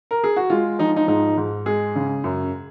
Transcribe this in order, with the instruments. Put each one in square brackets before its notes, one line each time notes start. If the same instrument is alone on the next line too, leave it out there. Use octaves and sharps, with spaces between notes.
[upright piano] A#4
G#4
F#4
G#3 F4
F3 D#4
D#4
G#2 D#4
G#2
G#3 G#4
C#3
F#2